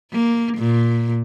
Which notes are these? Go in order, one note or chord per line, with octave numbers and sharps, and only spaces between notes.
A#3
A#2